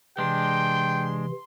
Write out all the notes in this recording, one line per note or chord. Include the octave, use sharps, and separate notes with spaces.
C3 E3 G#3 D4 G5 C6